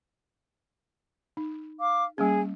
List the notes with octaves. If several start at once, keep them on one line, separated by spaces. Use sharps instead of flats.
D#4
F5 D6
G3 A#3 C#4 G#4